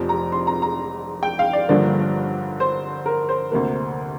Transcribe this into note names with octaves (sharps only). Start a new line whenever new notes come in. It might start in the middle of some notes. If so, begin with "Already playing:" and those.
Already playing: F1 F2 F3
A#5
C6
A#5
A#5
G5
F5
D5
G1 G2 D3 F3 A#3 D5
C5
A#4
C5
D2 C3 A#3